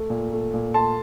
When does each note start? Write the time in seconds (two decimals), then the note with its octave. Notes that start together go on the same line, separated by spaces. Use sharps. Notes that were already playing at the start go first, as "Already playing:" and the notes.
Already playing: A3
0.10 A#2
0.32 A3
0.54 A#2
0.74 A3 A5 C6